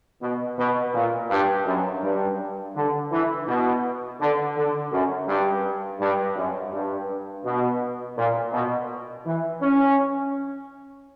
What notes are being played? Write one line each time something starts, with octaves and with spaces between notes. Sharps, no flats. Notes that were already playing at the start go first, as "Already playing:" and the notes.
B2
B2
A#2
G2
F#2
G2
D3
E3
B2
D3
D3
F#2
G2
G2
F#2
G2
B2
A#2
B2
E3
C#4